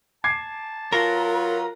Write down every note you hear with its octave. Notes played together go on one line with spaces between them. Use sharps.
A5 D6 G#6 C7
F#3 F4 A#4 B4